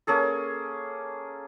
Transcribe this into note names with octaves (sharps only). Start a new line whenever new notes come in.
A#3 C#4 G#4 A4